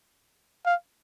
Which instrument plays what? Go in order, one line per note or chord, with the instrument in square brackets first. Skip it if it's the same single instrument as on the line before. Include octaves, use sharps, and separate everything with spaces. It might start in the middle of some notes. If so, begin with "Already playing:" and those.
[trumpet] F5